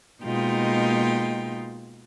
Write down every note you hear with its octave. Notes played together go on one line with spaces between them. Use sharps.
B2 G#3 A#3 D#4 F4 G5